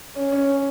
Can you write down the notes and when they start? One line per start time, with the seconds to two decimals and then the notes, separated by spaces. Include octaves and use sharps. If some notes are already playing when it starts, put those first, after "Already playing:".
0.15 C#4
0.32 C#4